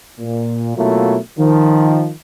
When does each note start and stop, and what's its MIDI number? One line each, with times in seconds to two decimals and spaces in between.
0.19 0.75 46
0.76 1.17 47
0.76 1.17 54
0.76 1.17 57
0.76 1.17 58
0.76 1.17 64
0.76 1.17 65
1.38 2.11 51
1.38 2.11 53